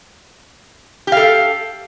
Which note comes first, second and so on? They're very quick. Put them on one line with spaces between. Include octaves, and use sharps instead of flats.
G4 F5 A4